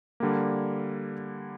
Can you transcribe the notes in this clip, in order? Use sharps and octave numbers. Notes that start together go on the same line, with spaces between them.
D3 G3 A#3